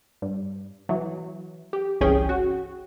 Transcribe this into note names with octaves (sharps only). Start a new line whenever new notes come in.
G2
E3 F#3
G4
G1 C2 E3 C#4 G#4 G5
F#4